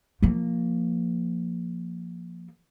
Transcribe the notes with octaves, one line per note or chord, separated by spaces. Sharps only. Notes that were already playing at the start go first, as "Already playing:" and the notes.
F3 A#3